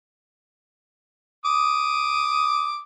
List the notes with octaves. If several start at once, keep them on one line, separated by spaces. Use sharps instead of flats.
D6 D#6